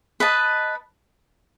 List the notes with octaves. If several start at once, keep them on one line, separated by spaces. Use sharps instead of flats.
B4 D#5 A5